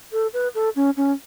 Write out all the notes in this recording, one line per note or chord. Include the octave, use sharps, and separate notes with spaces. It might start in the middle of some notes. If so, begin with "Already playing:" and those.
A4
B4
A4
C#4
C#4